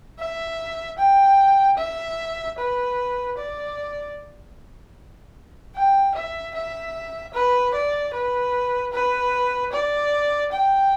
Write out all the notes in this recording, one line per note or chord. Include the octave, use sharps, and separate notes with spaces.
E5
G5
E5
B4
D5
G5
E5
E5
B4
D5
B4
B4
D5
G5